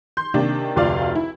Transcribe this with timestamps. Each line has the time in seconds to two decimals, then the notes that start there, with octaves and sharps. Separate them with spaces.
0.17 C6 G6
0.34 C3 D#3 A#3 D4
0.76 F1 D2 F4 D5 F5
1.15 E4